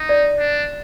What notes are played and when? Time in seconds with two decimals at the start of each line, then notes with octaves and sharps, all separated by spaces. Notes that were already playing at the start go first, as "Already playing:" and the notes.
Already playing: D#4
0.09 D5
0.38 D4